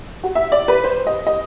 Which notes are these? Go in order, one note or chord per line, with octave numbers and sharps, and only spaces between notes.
F#4
E5
D5
B4
C5
D#5
D#5